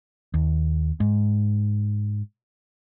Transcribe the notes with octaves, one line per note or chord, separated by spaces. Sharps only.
D#2
G#2